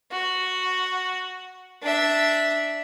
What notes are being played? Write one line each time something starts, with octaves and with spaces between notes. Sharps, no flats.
F#4
D4 E5